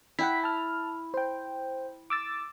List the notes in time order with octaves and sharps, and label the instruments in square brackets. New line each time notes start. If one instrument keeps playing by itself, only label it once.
[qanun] E4 [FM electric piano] F#5 G5 B6
[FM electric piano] A5 F6
C5 G5
D6 E6 A6